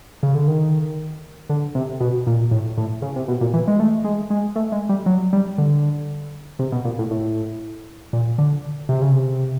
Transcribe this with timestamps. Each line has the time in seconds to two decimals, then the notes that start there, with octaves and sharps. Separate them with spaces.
0.23 C#3
0.35 D3
0.48 D#3
1.49 D3
1.75 C3
2.00 B2
2.27 A#2
2.51 A2
2.77 A2
3.02 C#3
3.16 C3
3.28 B2
3.41 A#2
3.54 E3
3.68 G#3
3.80 A3
4.04 G#3
4.30 G#3
4.56 A3
4.72 G#3
4.89 G3
5.06 F#3
5.33 G3
5.58 D3
6.59 C3
6.72 B2
6.85 A#2
6.99 A2
7.11 A2
8.13 A#2
8.38 D3
8.89 C3
9.02 C#3
9.12 C3